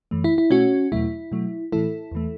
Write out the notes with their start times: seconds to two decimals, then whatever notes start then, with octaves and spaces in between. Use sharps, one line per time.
0.11 F#2 E3 A3
0.24 E4
0.38 E4
0.51 B2 A3 C#4 F#4
0.92 E2 B2 F#3 A3 E4
1.32 B2 F#3 A3
1.72 A2 E3 A3 E4 A4
2.12 E2 E3 A3